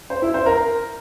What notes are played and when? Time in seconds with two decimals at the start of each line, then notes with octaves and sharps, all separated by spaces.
0.10 C5
0.22 E4
0.34 C5
0.46 A#4